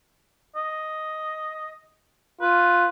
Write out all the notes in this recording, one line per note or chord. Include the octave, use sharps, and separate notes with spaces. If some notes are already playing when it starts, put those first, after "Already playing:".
D#5
F4 B4